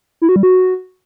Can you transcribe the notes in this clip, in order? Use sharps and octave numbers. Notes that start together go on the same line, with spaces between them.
E4
F#4
G3
F#4